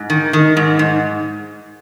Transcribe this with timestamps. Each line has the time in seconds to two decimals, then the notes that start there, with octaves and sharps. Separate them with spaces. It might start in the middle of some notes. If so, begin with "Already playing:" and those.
Already playing: G#2
0.10 D#3
0.33 D#3
0.57 G#2
0.79 G#2